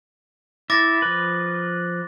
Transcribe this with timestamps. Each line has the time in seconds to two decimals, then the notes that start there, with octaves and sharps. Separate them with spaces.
0.70 E4 D6 A6 A#6
1.02 F3 B4